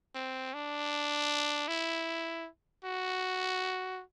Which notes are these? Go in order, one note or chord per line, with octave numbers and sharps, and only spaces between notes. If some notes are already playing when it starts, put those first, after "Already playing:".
C4
D4
E4
F#4